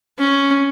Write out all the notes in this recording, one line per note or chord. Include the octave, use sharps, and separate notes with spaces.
C#4